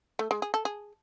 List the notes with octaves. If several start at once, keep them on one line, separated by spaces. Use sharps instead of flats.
A3
G#3
G#4
A4
G#4